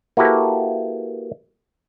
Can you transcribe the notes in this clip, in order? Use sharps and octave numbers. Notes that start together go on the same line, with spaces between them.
A#3 E4 F#4 G4 A4 B4